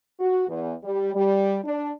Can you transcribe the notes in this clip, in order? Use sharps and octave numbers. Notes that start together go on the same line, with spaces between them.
F#4
E2
G3
G3
D4